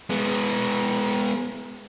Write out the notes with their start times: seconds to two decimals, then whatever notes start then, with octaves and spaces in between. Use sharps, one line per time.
0.10 G#3 B3